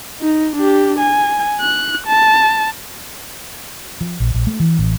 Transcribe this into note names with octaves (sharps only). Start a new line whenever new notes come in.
D#4
D4 G4
G#5
F#6
A5
F3
A#1
A#1
A3
E3
A1